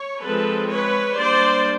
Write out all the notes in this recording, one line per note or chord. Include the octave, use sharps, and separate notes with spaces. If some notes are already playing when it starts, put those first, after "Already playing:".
Already playing: C#5
F3 G#3 C4 A4 B4
B4 C#5
G3 A#3 D4 C5 D5